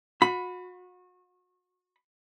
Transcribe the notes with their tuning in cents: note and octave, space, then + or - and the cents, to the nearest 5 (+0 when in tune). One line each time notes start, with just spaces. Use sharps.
F#4 -35 B5 +10